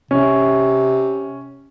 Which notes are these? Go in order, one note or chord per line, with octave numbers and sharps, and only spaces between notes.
C3 C#4